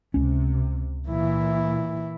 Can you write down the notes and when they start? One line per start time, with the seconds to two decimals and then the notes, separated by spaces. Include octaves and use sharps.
0.14 C#2 C3 C#4
1.09 A#2 E3 E4